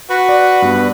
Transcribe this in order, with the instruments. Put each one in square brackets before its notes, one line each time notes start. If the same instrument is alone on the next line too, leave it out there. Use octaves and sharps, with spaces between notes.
[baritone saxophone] F#4 [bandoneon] B4
[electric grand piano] D5
G2 B3